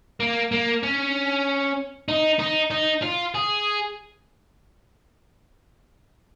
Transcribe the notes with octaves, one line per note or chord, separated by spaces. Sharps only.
A#3
A#3
C#4
D#4
D#4
D#4
F4
G#4